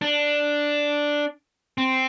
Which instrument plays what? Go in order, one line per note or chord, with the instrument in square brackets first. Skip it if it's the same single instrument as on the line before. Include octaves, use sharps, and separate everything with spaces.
[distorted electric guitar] D4
C4